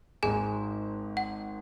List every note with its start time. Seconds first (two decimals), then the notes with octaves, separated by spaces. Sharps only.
0.23 G#1 G#2 G#3 G#4 G#5
1.17 F#5